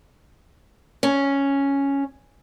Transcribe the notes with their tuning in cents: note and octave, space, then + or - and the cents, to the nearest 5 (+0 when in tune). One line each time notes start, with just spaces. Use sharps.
C#4 +0